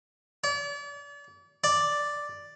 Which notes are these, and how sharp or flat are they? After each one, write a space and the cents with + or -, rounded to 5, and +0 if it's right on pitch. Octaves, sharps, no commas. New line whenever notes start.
D5 -40
D5 +0